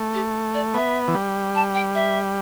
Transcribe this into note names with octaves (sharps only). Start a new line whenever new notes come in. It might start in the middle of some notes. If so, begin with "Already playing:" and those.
Already playing: A3
G4
D5
B3 E5
E3
G3
A5
G5
E5